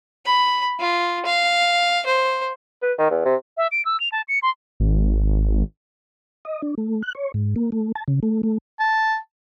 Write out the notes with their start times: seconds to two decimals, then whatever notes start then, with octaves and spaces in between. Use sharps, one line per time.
0.26 B5
0.80 F4
1.25 F5
2.06 C5
2.83 B4
2.99 D#3
3.11 E2
3.25 C3
3.57 E5
3.72 D7
3.85 E6
4.00 F7
4.12 A5
4.28 C#7
4.43 C6
4.80 G#1
6.45 D#5
6.62 D4
6.78 A3
7.02 F#6
7.15 C#5
7.34 G#2
7.56 A#3
7.72 A3
7.96 A5
8.08 C#3
8.23 A3
8.43 A3
8.80 A5